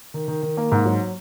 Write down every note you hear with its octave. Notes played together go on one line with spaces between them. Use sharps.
D#3
D#3
D#3
A#3
G#2
F#3